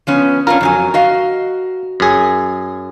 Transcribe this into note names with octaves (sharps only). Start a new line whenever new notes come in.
F3 B3 C#4
C#4 D4 F4 A#4
F2 F#3 G#5
F#4 D#5 F5
F#2 G#4